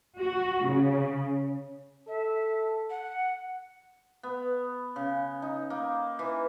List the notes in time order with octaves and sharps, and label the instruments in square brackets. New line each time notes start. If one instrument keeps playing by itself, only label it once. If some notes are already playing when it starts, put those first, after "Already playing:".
[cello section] F#4
C#3
[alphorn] A4 [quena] E5
[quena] F#5
[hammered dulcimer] B3
C#3
D#4
A#3
E3